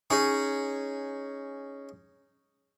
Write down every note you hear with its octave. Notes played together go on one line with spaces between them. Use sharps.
C#4 D#4 G#4